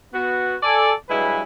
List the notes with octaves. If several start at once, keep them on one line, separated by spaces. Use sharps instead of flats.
B3 F#4
A4 D5 G#5
G2 F#3 G#3 E4 B4 G#5